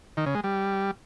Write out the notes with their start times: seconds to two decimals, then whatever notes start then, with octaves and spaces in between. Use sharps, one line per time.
0.17 D#3
0.26 C#3
0.35 G#3
0.44 G3